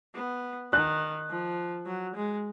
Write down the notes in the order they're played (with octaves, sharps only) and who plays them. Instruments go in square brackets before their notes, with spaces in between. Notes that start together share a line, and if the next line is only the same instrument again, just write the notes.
[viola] B3
[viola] D#3 [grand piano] F#6
[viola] F3
F#3
G#3